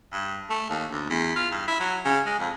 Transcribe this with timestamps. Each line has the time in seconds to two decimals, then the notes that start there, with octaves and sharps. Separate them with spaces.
0.13 G2
0.50 A3
0.70 D#2
0.91 D2
1.10 E2
1.36 F4
1.51 G2
1.68 E4
1.80 F#3
2.05 C#3
2.26 G#3
2.40 F2